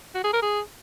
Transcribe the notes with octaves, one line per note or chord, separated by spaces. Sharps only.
F#4
G#4
A#4
G#4